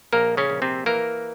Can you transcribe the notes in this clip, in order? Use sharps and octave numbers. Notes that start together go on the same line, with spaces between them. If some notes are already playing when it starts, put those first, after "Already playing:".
A#1 A#3 A#4
C#3 C#4
A#1
C3 C4
E3 A#3 A#4